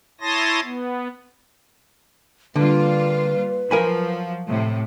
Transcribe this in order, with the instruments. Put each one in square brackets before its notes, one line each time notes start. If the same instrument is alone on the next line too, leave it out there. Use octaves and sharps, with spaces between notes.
[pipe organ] E4 C#5 A5 C6 D#6 A#6
B3
[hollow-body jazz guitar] D3 [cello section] G3 A#3 F4 [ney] B4
[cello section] F3 F#3 [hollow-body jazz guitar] A#4 G#5 B5
[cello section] A2 C3